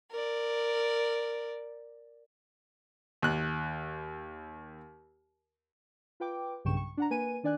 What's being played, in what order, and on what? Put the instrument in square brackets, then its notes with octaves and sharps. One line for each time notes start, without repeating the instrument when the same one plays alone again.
[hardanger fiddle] A#4 D5
[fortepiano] D#2 F#6
[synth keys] F4 B4 G5 D6
B1 G2 C#3 G5 C#6 E7
C#6
D4 F#5 A#5
A#3 B4 G#5 D#7
D#3 D4 D5 G#5 F#6